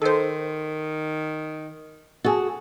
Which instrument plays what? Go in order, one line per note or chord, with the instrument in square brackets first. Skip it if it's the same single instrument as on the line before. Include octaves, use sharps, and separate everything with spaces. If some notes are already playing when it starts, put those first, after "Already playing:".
[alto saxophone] D#3 [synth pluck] A4 C5
[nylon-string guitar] F#4 G#4 [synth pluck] A4